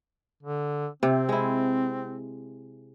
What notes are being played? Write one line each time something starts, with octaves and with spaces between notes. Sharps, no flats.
D3
C3 C4
G#3 E4